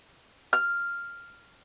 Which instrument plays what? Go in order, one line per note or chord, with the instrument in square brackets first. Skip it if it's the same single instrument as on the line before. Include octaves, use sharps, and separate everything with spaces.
[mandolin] F6